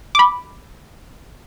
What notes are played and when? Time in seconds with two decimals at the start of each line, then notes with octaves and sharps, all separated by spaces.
0.15 B5 D6